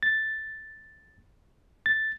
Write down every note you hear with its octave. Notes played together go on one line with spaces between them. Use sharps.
A6
A6